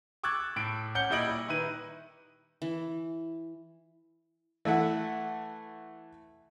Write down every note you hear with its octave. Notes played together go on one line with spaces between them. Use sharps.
C#6 D6 E6 F#6 G#6 A6
A2 D7
C#4 F#5 G6 C#7 G7
A#2 G3 E4 D#5 D7 F#7
D#3 E4 B4 D#7
E3
E3 A3 E5 F#5